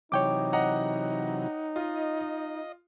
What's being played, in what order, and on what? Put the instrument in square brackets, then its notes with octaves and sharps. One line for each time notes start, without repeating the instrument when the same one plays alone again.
[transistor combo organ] C3 E3 F#3 [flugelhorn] D#4 [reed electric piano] C#5 G5 D6
[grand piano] D#5 F#5 A#5
[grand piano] F4 [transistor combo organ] D#5